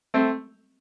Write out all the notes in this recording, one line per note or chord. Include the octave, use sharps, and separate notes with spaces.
A3 C4